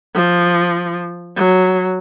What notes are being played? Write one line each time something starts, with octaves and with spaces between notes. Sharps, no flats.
F3
F#3